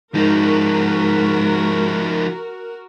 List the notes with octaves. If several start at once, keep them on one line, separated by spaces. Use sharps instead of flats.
G#2 F3 D#4 F#4 A#4